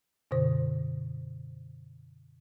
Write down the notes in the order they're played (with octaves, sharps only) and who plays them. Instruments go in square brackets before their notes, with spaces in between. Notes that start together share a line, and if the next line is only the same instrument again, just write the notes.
[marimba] F#2 B2 D3 C5